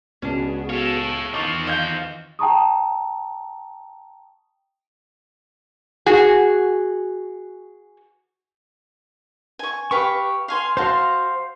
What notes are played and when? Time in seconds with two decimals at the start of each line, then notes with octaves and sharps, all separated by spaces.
0.22 C#2 B3 C#4 D4 F#4 G#4
0.70 A4 C#5 F5
1.33 E2 D#3 C4 F4 D#5 C#6 D6
1.67 D#5 F5 G6
2.39 G5 A5 A#5 C#6 D#6
6.06 F#4 G#4
9.59 G#5 C#6
9.91 G4 B4 F5 C#6
10.48 F5 G#5 C6
10.77 F#4 C5 F5 A5 C6